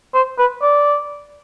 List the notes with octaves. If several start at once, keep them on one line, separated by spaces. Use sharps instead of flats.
C5
B4
D5